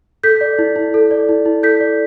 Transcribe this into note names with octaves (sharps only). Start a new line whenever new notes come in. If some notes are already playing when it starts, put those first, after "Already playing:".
A4 G6 B6
D5
E4
E4
A4
D5
E4
E4
A4 G6 B6
D5